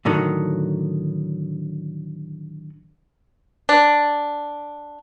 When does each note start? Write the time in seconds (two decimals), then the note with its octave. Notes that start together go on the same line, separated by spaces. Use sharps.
0.05 A2 D3 D#3 F#3
3.69 D4